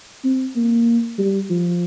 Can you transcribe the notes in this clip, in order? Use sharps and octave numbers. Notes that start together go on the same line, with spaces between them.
C4
A#3
G3
F3